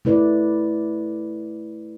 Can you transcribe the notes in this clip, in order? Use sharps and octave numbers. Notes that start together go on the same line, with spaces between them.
A3 E4 B4 D5